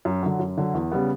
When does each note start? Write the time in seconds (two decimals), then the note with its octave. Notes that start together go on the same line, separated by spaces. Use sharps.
0.05 F#2
0.23 D3 F#3
0.39 F#2
0.58 D3 F#3
0.74 E2
0.92 C#3 G3 B3